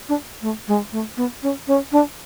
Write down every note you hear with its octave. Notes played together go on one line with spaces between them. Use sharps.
D4
A3
G#3
A3
B3
C#4
C#4
D4